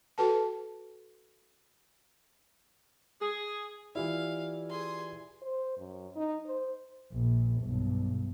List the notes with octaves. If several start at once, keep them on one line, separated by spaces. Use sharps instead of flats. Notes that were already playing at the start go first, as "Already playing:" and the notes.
F#4 A4 B4 G5 A5
G#4
E3 E4 F4 G4 D5 F5
G#4 C6
C5
F#2
D#4
C5
A#1
B1 G2